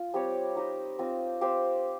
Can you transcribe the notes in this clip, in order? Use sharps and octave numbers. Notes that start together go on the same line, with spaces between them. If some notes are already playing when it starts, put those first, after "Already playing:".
Already playing: F4
G3 C4 G4 C#5
D#4 G4 C5 D#5
C4 F4 C5 D#5
C4 G4 C5 F5